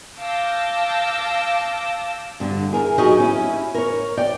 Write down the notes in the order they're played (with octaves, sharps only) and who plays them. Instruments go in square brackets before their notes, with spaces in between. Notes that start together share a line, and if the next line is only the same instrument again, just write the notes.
[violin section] F5 A5 D6 E6 G6 A#6
[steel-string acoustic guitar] G2 D3
E4 G#4 A#4
F#3 D#4 G4 G#4 C#5 D#5
C#4 E4
A#4 C#5
D5 G5